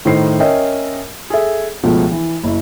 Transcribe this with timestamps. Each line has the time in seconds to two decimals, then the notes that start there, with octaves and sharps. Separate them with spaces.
0.05 A2 D#3 D#4 E4 C5 C7
0.40 C#4 A#4 C#5 D#5 E5 G5
1.30 G#4 A4 E5
1.83 C#2 B2 F3 A3
2.12 E3
2.44 F#1 E4